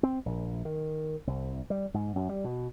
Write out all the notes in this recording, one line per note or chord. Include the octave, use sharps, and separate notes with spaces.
C4
A#1
D#3
C2
G3
G#2
F#2
G3
B2